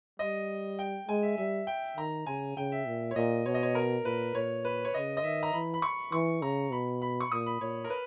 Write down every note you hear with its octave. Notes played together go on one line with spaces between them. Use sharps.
G3 D#5
G5
G#3 G#5
E5
G3 E5
G5
D#3 A#5
C#3 G#5
C#3 G5
E5
A#2
C#5
A#2 D#5
B2 C#5
D#5
C#5
A#4
A#2 B4
A#2 C#5
B4
C#5
C#3 D#5
D#5
D#3 E5
A#5
E3 B5
B5
C#6
E3 C#6
C#3 A#5
B2 B5
B5
C#6
A#2 D#6
B5
A#2 C#5
A#4
B4